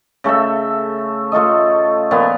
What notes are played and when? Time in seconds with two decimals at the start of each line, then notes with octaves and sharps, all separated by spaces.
0.24 C#3 A3 A4 E5
1.32 A3 F4 A4 D#5
2.11 A#2 F3 B3 F5